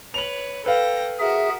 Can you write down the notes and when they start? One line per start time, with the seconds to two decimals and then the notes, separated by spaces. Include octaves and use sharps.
0.14 B4 C#5 F7 F#7
0.66 A4 B4 F5 G5 A#6
1.19 F#4 G#4 A#4 E5